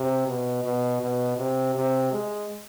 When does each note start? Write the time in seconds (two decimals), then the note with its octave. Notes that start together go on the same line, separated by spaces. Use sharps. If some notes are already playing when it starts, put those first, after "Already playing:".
Already playing: C3
0.27 B2
0.65 B2
1.01 B2
1.38 C3
1.75 C3
2.12 G#3